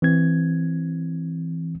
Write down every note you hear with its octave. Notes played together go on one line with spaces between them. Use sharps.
E3 C4 G#6